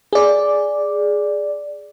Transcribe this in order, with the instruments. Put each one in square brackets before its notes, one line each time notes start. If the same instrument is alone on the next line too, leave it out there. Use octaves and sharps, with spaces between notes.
[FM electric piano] G#4 D5